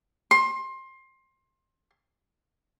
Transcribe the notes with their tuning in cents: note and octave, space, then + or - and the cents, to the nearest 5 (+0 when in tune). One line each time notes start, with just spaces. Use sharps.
C6 +25